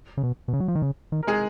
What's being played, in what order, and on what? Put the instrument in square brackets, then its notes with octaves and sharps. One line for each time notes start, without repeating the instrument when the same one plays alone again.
[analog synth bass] C#3
B2
B2
C#3
F#3
F3
D#3
C#3
D#3
[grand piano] A#4
G#3 G#4